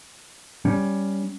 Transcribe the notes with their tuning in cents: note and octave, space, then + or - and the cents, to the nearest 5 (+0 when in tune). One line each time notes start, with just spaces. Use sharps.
G3 +0 C#4 +5